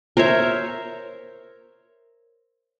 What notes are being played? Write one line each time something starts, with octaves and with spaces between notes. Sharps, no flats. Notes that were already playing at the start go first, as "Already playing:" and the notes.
A#4 C5 C#5 E5